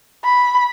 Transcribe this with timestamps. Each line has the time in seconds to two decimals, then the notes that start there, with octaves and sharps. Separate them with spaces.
0.24 B5